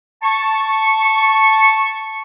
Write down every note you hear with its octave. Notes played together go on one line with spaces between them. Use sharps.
A5 C#6